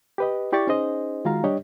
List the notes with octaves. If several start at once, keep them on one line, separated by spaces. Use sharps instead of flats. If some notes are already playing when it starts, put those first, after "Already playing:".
G4 B4 D#5
E4 G4 D5 C#6 A6
C#4 D#4 G#4 C5 D#5
D#3 G#3 F4 F#4 F5 A#5
G3 D4 G4 C#5 D#5